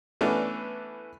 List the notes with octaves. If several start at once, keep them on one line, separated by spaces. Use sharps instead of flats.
E3 A3 B3 C#4 D4